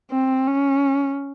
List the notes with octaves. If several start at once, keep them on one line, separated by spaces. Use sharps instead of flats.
C4
C#4